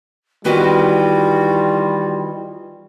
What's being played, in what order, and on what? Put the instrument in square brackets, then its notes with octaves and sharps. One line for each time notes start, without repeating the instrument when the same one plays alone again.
[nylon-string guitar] D#3 E3 B3 [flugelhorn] G3 [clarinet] F4 [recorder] F#4